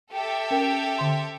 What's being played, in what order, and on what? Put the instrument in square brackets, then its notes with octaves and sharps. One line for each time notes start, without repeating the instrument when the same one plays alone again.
[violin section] G4 A4 E5
[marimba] C#4 A#4 G5
D3 C6